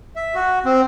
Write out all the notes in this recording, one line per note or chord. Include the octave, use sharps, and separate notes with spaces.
E5
F#4
C4